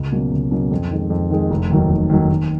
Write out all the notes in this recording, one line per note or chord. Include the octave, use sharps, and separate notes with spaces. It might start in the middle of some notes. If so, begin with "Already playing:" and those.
Already playing: C#2
B2 F#3 A#3 C#4
C#2
B2 F#3 A#3 C#4
F2
D#3 G#3
F2
D#3 G#3
F1
D#2 D#3 F#3
F1
D#2 D#3 F#3
D#2